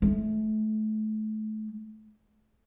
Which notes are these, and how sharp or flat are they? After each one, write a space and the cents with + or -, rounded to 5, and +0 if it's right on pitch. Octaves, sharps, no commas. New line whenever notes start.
A3 -30